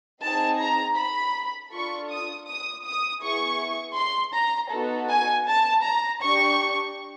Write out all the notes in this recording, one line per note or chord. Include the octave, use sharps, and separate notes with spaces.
C4 D#4 G#4 A5
A#5
B5
D4 F4 A4 C#6
D#6
D#6
D#6
B3 E4 G#4 C#6
C6
A#5
B3 D#4 F#4 A4
G#5
A5
A#5
D4 G4 C#6